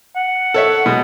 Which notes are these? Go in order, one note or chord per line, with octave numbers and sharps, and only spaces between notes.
F#5
A4 C#5 E5
B2 G#3